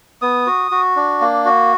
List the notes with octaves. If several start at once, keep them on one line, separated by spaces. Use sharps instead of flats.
B3 D#6
F#4
F#4
D4
A#3
F#4